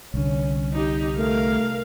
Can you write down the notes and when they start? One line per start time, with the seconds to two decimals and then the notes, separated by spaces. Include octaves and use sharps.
0.14 C2 D3 C#4
0.73 D#4 G4
1.17 A3 A#4 F5